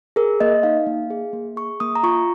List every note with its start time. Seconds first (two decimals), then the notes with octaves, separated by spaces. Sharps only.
0.16 G#4 A#4
0.40 A#3 D#5
0.63 D#4 F5
0.86 A#3
1.10 G#4
1.33 A#3
1.56 G#4 C#6
1.80 A#3 D#6
1.95 A#5
2.03 F4 C#6